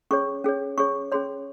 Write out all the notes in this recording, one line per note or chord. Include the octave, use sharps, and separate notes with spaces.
C#4 G#4 C#5 C#6
C#4 G#4 C#5
C#4 G#4 C#5 C#6
C#4 G#4 C#5 C6